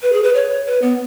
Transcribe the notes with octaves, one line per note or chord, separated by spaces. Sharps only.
B4
G#4
B4
C#5
B4
B3